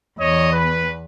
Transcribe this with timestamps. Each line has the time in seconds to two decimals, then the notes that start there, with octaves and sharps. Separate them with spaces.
0.19 E2 C#5 D#5
0.53 B4